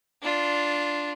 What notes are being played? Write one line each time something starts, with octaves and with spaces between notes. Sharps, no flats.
D4 F4